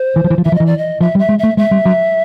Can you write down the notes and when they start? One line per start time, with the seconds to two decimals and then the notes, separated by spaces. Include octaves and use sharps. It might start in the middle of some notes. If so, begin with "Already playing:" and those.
Already playing: C5
0.16 E3
0.24 F3
0.30 E3
0.38 F3
0.45 E3 E5
0.52 F3
0.55 D#5
0.60 E3
0.66 D5
0.78 D#5
1.01 F3 E5
1.15 G3
1.19 E5
1.29 G#3
1.39 A3 E5
1.57 G#3 E5
1.71 G3
1.85 F#3